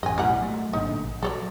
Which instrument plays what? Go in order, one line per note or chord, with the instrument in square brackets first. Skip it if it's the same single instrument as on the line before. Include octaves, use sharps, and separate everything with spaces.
[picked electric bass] A1 F#2 [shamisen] D#5 G#5
[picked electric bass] B1 A2 [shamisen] G3 A#4 F#5
[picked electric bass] F#3 A3
[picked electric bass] G#1 A#2 D3 [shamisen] D#4
[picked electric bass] A#1
[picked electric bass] F#3 [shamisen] A4 C#5 D5